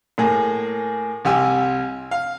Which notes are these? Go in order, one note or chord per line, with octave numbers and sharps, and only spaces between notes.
A2 A#3 G#4
C2 G4 G#5 E6
F5